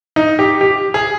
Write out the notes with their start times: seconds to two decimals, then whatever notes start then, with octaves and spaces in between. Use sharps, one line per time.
0.16 D#4
0.39 G4
0.61 G4
0.94 G#4